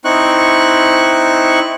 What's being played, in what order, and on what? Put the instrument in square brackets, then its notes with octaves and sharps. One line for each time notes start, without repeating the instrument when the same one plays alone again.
[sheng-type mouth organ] C4 D#4 E4 C#6 F#6